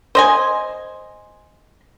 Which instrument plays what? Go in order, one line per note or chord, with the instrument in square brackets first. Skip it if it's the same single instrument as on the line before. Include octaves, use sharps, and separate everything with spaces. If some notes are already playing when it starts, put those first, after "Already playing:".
[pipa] C5 D#5 G#5